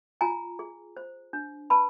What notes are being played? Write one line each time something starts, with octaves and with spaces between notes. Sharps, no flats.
F4 G#5 A#5
G#4
C5
D4
B4 A5 B5